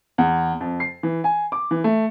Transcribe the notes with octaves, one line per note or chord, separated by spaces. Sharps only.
E2
F2
C7
E3
G#5
D6
E3
A3